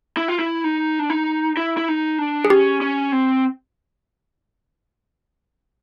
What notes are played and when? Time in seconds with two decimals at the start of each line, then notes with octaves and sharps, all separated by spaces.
0.17 E4
0.28 F4
0.39 E4
0.64 D#4
0.99 D4
1.10 D#4
1.57 E4
1.77 E4
1.88 D#4
2.18 D4
2.45 G#4
2.50 C#4 G4
2.81 C#4
3.12 C4